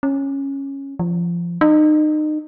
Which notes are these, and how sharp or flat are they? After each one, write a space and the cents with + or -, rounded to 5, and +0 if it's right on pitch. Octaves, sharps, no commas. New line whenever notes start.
C#4 -10
F3 -20
D#4 -30